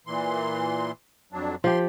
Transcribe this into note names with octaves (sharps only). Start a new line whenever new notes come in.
A#2 E3 C6
F2 F#3 D4
F3 G4 C6